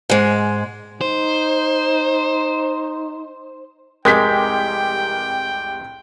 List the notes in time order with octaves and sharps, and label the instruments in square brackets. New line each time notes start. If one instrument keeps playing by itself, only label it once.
[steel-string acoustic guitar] G#2 G#3
[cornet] D#4 [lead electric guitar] C5
[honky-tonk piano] F1 C2 G4 [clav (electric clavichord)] G#3 [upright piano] A#4 G6 B6 [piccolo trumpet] G5